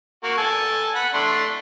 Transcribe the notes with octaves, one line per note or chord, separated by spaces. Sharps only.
A#3 F#4
A4 G#5 A5
F#5 B5
A3 D4 C6